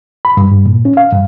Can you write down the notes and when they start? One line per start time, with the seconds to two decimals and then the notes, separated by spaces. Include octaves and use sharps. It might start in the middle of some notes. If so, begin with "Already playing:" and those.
0.25 B5
0.37 G2
0.51 G2
0.66 A#2
0.85 C#4
0.97 F5
1.13 G2